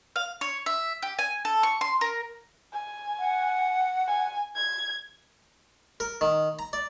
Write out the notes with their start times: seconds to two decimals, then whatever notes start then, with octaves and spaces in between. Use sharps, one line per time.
0.16 F5
0.41 C#5
0.66 E5
1.02 G4
1.19 G#5
1.45 A4
1.63 C#6
1.81 C6
2.01 A#4
2.73 G#5
3.19 F#5
4.08 G#5
4.56 G#6
6.00 A#4
6.21 D#3
6.59 A#5
6.73 D5